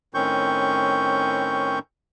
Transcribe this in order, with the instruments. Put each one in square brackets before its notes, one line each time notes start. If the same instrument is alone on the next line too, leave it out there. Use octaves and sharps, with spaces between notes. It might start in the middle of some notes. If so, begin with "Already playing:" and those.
[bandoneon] A2 D#3 C4 C#4 C#6 G6